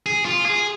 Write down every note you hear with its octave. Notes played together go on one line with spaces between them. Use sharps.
G#4
F4
G#4